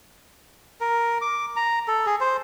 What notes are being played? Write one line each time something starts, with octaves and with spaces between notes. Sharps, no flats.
A#4
D6
A#5
A4
G#4
C5